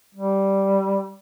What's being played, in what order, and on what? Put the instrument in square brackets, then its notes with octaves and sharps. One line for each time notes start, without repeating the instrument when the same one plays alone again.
[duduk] G3